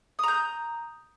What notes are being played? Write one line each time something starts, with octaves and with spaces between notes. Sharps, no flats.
A#5 D#6 G6